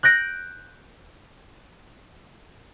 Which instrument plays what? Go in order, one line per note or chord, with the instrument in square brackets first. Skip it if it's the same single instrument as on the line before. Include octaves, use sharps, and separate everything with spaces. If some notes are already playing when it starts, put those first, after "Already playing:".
[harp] F#6 G6 A#6 D7